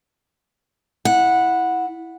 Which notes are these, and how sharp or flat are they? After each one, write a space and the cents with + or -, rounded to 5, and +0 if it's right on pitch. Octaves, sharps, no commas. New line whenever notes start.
E4 +0 F#5 -10